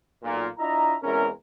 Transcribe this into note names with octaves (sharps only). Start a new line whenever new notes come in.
B1 A#2
D4 E4 F4 D#5 E5 A#5
E2 C3 G#3 C#4 E4 A#4